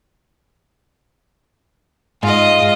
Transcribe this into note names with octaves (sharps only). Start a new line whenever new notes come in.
G#2 F4 D#5